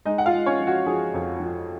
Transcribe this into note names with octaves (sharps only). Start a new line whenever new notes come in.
G#3 D#4 D#5
F#5
F4 F5
G#3
C#4 C#5
F3
F#4
F3 G#4
F2
F3